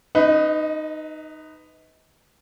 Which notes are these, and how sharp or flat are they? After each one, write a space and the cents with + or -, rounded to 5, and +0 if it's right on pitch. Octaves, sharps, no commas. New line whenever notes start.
D#4 -10 B4 +15 D#5 +30